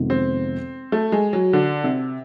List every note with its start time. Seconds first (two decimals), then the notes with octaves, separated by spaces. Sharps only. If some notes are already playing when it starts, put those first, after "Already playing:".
Already playing: F2 C3 D#3 G#3 B3
0.10 C4
0.92 A3
1.12 G#3
1.33 F#3
1.53 D3
1.84 C3